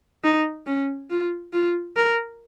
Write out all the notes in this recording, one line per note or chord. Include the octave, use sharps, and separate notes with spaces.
D#4
C#4
F4
F4
A#4